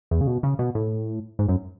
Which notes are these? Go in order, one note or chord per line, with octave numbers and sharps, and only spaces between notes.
E2
C#3
B2
C#3
B2
A2
G#2
F#2